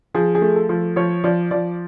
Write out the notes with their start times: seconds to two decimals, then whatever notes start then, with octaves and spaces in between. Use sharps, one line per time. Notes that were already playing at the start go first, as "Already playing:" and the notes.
0.14 F3 G#4
0.35 G#4
0.42 A3
0.56 A4
0.69 F3
0.96 F3 C#5
1.24 F3 D5
1.51 F3 D5